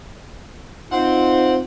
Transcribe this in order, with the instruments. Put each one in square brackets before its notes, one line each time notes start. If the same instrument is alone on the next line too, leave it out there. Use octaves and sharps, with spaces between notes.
[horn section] C4 [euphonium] D#4 [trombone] F4 [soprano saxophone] F#5